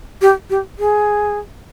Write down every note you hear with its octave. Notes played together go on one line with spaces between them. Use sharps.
G4
G4
G#4